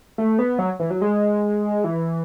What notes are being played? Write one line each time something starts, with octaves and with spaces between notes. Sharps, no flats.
A3
B3
F#3
E3
F#3
G#3
E3